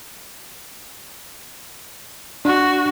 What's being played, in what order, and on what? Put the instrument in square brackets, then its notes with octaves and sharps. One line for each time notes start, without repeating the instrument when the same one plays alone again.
[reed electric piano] D4 [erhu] F#4